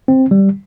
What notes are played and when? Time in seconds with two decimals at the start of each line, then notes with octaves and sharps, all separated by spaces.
0.08 C4
0.31 G3